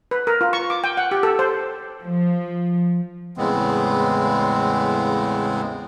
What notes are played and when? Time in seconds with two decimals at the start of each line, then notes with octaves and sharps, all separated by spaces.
0.11 B4
0.27 A#4
0.41 F4
0.53 C#6
0.70 D6
0.84 G5
0.97 F#5
1.11 G4
1.23 A4
1.39 C5
2.04 F3
3.37 E2 A2 C#3 G#3 B3 C4